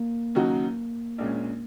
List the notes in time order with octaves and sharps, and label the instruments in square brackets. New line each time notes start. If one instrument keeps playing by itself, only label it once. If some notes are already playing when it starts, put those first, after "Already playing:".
Already playing: [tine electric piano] A#3
[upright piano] D#2 C#3 F#3 D#4 F#4
A#1 A#2 G#3 C#4